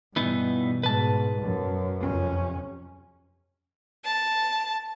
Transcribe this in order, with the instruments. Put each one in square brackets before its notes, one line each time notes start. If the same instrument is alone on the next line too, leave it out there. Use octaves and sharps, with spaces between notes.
[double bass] G2 [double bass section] B2 [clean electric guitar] E3 B3 D#4
[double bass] G#2 [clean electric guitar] B4 A5
[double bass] F#2
[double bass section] F2 C3 C#4
[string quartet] A5